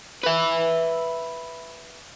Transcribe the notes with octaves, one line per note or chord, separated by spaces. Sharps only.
B4 E5